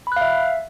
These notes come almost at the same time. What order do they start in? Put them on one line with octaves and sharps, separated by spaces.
B5 F#6 F5 E5